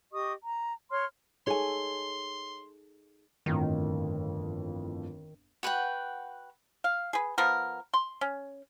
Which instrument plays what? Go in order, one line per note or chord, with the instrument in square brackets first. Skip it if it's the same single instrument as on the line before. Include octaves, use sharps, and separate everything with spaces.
[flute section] G4 D#5 C#6 D#6
A#5
C#5 C6 F6
[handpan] D#4 G#4 A4 [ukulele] C#5 G#5 [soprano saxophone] C6
[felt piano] G1 F2 A2 [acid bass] D#3
[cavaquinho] F#4 B4 F#5 G5
[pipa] F5
G#4 B4
F3 B3 A#4
C6
C#4